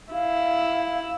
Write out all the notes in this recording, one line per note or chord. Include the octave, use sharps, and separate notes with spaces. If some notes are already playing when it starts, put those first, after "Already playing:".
E4 F5